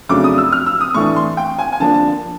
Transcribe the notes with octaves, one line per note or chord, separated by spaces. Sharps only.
F2 C#3 F#3 A3 D4 D6
D#6
E6
F6
E6
D#6
A2 E3 A3 D4 C#6
C6
G5
G#5
G#5
D3 F3 A#3 D4 A5
A5